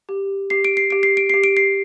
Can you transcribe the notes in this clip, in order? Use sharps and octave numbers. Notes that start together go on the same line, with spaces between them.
G4
G4 C7
D7
C7
G4 D7
C7
D7
G4 C7
D7
C7